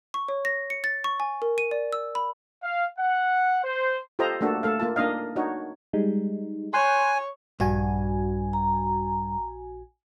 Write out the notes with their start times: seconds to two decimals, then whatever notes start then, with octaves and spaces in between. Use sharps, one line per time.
0.14 C#6
0.28 C#5
0.45 A#6
0.70 C#7
0.84 A6
1.04 C#6
1.20 G#5
1.42 A#4
1.58 D#7
1.71 D5
1.93 E6
2.15 B5
2.63 F5
2.97 F#5
3.64 C5
4.19 F4 G4 A4 C5 D#5 A#5
4.41 A3 A#3 D4 F#4 A4
4.63 A3 A4 F5
4.80 A#3 F4 A5
4.96 A#3 D4 D#4 D#5 F5
5.36 D4 D#4 F#4 C#5
5.93 G3 G#3 D#4
6.74 C#5 G#5 C6 F#6 G6
7.60 A#1 G2 F#4 G#5
8.53 A#5